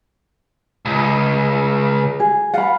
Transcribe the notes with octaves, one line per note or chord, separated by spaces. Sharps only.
C#2
G#4
F5 F#5 B5